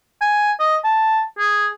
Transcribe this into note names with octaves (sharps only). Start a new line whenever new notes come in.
G#5
D#5
A5
G#4